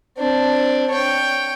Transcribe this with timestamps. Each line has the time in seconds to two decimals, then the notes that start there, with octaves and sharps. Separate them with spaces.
0.18 C4 D4
0.91 C#5 G5